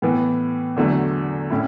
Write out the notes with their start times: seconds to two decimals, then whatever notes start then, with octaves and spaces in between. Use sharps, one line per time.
0.02 A2 E3 B3
0.76 E2 D3 F#3 A3
1.50 A2 C#4 E4